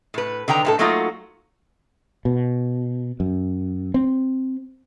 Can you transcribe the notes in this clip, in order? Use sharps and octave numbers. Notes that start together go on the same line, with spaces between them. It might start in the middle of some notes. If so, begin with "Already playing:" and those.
A2 B4
D3 D#3 G5 A#5
A2 E4 A4
F#3 A3 A#3 D#4 F4 F#4
B2
F#2
C4